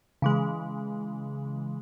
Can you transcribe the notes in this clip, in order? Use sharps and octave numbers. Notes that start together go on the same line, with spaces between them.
C#3 E3 G#3